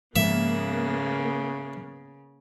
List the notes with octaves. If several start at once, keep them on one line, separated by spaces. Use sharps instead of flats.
G#2 C#3 F3 G#3 A#3 B3 E5